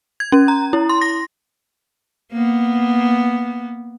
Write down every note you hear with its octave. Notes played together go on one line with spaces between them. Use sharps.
G#6
C#4
A#5
E4
C6
A#6
A#3 B3